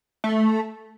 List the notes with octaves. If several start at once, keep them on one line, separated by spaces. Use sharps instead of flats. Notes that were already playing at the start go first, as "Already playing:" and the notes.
A3